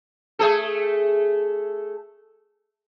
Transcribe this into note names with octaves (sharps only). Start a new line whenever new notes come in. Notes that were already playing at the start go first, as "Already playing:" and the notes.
A3 G#4 A4